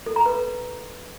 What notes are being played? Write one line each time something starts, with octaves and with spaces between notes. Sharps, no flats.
A4
A#5
B4